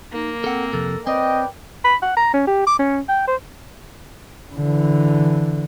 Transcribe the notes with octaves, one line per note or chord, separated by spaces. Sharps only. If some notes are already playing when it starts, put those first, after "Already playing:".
A#3 D#4
C4 A4 F#5
F2 C3 A4
C4 B4 D5 D#5 G5
B5
F#5
A#5
C#4
G4
D6
C#4
G5
C5
D3 E3